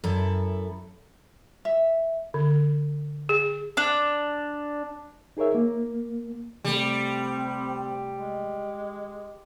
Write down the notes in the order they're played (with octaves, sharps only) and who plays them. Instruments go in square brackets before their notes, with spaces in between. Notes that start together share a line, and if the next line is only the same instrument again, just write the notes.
[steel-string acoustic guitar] F#2 E4 A4
[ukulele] E5
[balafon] D3
G#4
[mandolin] D4
[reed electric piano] D#4 G#4 A#4 C#5 E5
A#3
[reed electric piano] C3 A3 [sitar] G3 [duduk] C4
[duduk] G#3